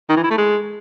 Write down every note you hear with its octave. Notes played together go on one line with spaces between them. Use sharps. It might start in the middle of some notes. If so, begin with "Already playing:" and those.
D#3
E3
E4
A3
G#3